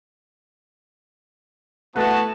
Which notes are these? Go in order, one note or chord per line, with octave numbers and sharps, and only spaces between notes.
A3 B3 E4 F#4 A4 B4 A5